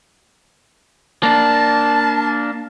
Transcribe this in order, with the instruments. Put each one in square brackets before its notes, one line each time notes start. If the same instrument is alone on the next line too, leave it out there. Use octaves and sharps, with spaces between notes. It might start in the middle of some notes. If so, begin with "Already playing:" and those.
[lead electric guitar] A#3 D4 [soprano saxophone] A5